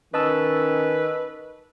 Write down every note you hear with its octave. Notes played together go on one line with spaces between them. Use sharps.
D#3 C#4 B4 D#5 A5 E6